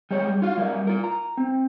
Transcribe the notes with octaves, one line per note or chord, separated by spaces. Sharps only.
G3 G#3 C#5
F4 F#4 F5
G3 A#3 E5
F4 A#4
A#5
C4